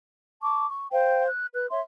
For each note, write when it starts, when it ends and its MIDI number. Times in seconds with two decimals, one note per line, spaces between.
0.42 0.66 81
0.42 0.66 85
0.42 0.66 86
0.70 0.88 85
0.91 1.26 72
0.91 1.26 77
0.91 1.26 79
1.27 1.47 90
1.54 1.66 71
1.54 1.66 90
1.70 1.80 73
1.70 1.80 76
1.70 1.80 84